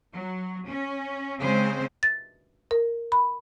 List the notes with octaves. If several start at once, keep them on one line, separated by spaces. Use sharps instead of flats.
F#3
C#4
C#3 G#3 C4 C5
A6
A#4
B5